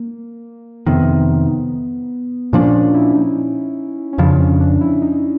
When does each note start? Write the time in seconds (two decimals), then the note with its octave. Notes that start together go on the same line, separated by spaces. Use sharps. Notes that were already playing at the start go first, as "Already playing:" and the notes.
Already playing: A#3
0.87 F2 C3 D#3 B3
2.53 A#2 F3 A#3 C#4 D4
2.94 E4
3.15 D#4
4.13 C#4
4.18 F2 C#3 F3 D4
4.40 C#4
4.60 D4
4.81 E4
5.02 D#4